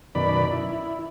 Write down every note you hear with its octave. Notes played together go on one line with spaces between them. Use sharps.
F#2 B2 D#3 D5 B5
E4